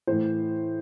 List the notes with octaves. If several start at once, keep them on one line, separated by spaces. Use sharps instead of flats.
A2 E3 C5